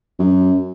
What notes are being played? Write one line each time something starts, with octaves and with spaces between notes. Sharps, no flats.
F#2